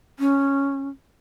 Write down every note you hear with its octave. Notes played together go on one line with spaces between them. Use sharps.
C#4